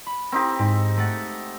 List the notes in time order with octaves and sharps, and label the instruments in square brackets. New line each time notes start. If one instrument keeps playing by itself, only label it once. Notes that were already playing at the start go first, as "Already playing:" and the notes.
[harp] B5
[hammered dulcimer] C4 D#4 G4
[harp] G#2
A3 F#5 A6